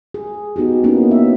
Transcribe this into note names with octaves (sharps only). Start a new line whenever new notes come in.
G#4
B3 D#4 F#4 G4
A#3 B3 C#4 D#4 E4
B3 C4 E5